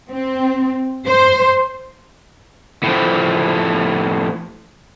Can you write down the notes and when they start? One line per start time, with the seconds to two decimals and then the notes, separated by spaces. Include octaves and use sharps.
0.11 C4
1.06 C5
2.83 A2 F3